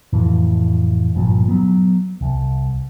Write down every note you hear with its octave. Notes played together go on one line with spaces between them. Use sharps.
F2 A2 E3
G1 G2 A#2 F3
F#3 B3
C2